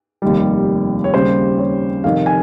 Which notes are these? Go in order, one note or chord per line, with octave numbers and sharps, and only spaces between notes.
F1 D#2 D#3 G3
C#5
D#2 C#3 G3 C5
C#5
F1 F2 D#3 F5
G#5